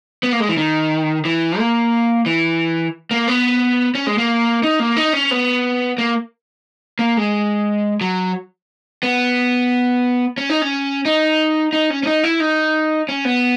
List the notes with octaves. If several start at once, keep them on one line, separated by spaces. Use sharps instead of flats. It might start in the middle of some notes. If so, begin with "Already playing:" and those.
B3
A#3
G#3
E3
D#3
E3
A#3
E3
A#3
B3
C#4
G#3
A#3
D#4
A#3
D#4
C#4
B3
A#3
A#3
G#3
F#3
B3
C#4
D#4
C#4
D#4
D#4
C#4
C#4
D#4
E4
D#4
C#4
B3